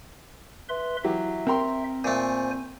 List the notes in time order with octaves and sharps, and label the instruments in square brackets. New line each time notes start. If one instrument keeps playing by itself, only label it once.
[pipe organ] B4 E5 C6
[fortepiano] E3 F#3 G4 [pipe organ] E5
[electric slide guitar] C4 A#5 [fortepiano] A#4 G5 C6
[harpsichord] A#2 A3 [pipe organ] C5 G#5